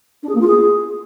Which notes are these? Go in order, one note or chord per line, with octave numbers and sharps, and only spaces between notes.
D4
G#4
A#3
F4
G#4